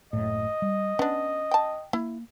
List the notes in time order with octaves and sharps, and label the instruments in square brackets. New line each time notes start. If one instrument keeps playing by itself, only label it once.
[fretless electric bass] F#1 A2 [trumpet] D#5
[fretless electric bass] G3
[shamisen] B3 D4 [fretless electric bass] C#4
[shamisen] G5 A5
[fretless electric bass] A#3 [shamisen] E4